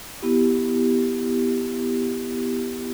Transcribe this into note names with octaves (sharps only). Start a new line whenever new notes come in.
B3 E4 G4